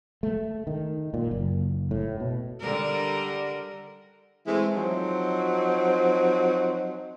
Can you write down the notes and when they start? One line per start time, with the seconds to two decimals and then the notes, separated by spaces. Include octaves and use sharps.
0.23 A3
0.67 D#3
1.14 A#2
1.31 F#1
1.91 A2
2.20 B2
2.60 D3 G3 A#4
4.46 E3 G#3 A3 C4 E4
4.75 F3 F#3 C4 D#4